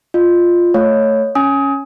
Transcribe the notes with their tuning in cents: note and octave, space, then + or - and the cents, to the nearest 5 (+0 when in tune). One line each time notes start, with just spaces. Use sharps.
F4 +0 D#5 -30
A3 +5 C#5 +0 F5 +0
C#4 +0 G#5 +0 D#6 +25